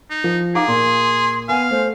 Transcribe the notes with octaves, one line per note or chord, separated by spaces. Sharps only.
D#4
F3
D#4 G#4 F5 A#5 D6
A#2 C6
B3 F5 G#5
A3 C5